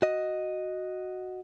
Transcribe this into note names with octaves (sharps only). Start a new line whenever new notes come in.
F#4 D#5